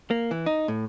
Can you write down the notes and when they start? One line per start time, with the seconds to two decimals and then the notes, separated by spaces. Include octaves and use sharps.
0.11 A#3
0.31 E3
0.46 D#4
0.68 A2